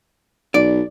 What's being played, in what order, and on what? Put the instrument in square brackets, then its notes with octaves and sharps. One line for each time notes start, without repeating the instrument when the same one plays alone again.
[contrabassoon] B1 [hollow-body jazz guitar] D5